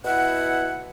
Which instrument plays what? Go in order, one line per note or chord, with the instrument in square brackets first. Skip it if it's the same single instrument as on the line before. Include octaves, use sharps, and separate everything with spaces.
[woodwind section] B2 E4 E5 F#5